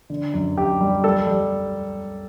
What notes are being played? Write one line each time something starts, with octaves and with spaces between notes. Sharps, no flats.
D3
F#2
F#2 G4
G3
G3 A4
G3